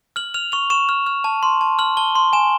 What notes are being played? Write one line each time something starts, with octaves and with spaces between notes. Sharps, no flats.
F6 F#7
F6 F7
C#6 F7
C#6 E7
F6
F6
A5
C6
A5
F6 F#7
A5 G7
C6
G#5 E7